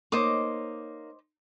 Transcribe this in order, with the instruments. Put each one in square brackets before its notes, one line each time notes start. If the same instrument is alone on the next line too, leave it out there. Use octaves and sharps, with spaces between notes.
[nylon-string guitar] A#3 D#4 C#5 [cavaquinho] C5 D#5 D6